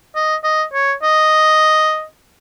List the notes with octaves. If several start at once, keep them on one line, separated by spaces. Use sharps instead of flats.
D#5
D#5
C#5
D#5